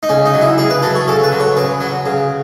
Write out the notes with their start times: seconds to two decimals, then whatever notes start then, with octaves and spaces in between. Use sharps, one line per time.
0.03 D#4
0.09 C#3 C#4
0.26 D#4
0.34 F#3
0.41 E4
0.58 C#3 G#4
0.70 B4
0.82 F#3 A4
0.95 C#5
1.08 C#3 A4
1.24 B4
1.32 F#3
1.40 C#5
1.57 C#3 B4
1.81 F#3
2.06 C#3